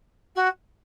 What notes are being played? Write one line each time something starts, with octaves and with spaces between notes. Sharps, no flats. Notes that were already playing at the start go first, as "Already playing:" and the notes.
F#4